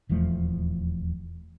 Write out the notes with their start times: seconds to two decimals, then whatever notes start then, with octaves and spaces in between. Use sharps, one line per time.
0.09 D#1 E2 F3 A3